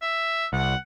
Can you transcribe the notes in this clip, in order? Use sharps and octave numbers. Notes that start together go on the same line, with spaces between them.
E5
C2 F#5